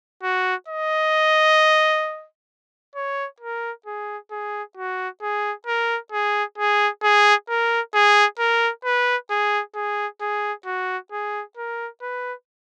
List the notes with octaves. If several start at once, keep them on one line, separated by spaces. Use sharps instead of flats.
F#4
D#5
C#5
A#4
G#4
G#4
F#4
G#4
A#4
G#4
G#4
G#4
A#4
G#4
A#4
B4
G#4
G#4
G#4
F#4
G#4
A#4
B4